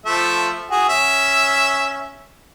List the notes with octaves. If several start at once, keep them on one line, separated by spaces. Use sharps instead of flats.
F3 A3 E5
F#4 G#4
C#4 E5